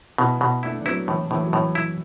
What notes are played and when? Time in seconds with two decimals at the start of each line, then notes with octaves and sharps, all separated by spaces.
0.18 B2 B3 E4
0.41 B2
0.63 A3 D4 E4
0.80 D4
0.86 F#3 B3 E4
1.08 A2 E3
1.31 A2 E3 A3
1.42 F#3
1.53 A2 E3
1.75 E4